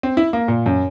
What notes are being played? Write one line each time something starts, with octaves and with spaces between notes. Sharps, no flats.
C4
E4
A#3
A#2
F#2